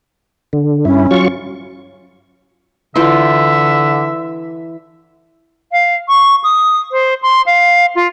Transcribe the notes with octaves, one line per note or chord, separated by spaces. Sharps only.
D3
G2 C#4 E4
F#3 F4 C#6
D3 E3 F4 E5 G5
F5
C#6
D#6
C5
C6
F5
F4